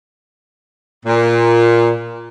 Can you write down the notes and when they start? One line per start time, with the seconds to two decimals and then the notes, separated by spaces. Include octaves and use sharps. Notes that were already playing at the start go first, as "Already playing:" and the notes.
1.06 A#2